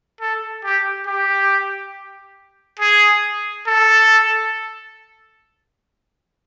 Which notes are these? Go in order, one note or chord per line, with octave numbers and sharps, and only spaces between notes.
A4
G4
G4
G#4
A4